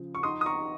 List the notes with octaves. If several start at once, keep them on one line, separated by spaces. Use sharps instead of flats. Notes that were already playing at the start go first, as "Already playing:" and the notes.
Already playing: C#3 F3
C#6
D#4 C6 D#6
D#6
A#5 C#6
D#4